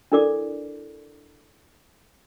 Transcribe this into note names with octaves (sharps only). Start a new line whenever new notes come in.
D4 E4 A4 A#4 D5 D6